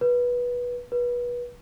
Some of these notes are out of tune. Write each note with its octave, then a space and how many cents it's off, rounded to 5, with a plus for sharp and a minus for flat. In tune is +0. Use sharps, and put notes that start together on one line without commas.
B4 -15
B4 -25